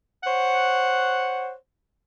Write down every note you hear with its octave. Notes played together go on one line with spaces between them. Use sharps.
C5 C#5 F#5